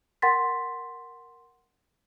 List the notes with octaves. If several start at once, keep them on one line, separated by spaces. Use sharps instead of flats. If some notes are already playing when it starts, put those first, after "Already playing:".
A#4 F#5 G5 C6 A6 B6